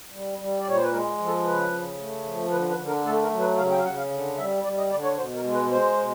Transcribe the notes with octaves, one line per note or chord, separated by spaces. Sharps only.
G3
G3
D5
A#2 C#5
C5
B4
G#3 A#4
F3
A4
C#3 B4
C#3
A3
F3
D3 B4
B4
D3
A#4
A3 A4
A#4
F#3
B4
C#3 F5
G5
F5
C#3 F#5
F5
D3
G3 E5
G3 D5
D#5
D3 D5
C#5
B2 C5
A#4
G#3
B4
G#3 C5
B2